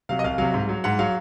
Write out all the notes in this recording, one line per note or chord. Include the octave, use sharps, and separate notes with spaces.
C3 F#3 F5
D#5
C2 F5
C3 F#3 F5
G#2
F#3
G#2 F#5
F#3 F5